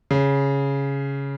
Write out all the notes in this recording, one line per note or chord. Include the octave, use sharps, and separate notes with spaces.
C#3